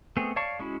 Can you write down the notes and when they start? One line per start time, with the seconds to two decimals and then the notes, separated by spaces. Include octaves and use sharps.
0.17 A3 B3 C4 G#4
0.36 C#5 D5 F5 A5 C#6
0.59 G#3 C#4 E4 F#4